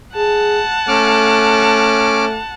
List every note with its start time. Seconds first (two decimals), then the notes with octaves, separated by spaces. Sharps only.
0.16 G#4 F#5 A5
0.88 A3 C#4 D6 F6